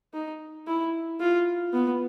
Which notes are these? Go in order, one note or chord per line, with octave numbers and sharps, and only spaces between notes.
D#4
E4
F4
B3